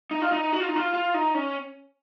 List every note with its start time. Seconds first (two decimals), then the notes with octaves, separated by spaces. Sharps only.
0.11 D#4
0.22 F4
0.32 D#4
0.53 F#4
0.60 F4
0.68 D#4
0.76 F4
0.94 F4
1.14 D#4
1.35 C#4